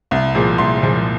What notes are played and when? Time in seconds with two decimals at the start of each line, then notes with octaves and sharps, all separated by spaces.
0.11 C2
0.35 A#2 F3 G#3
0.58 C2 C6
0.82 A#2 F3 G#3